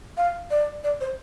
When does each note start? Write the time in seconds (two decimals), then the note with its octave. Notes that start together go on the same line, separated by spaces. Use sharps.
0.17 F5
0.51 D5
0.84 D5
1.01 C5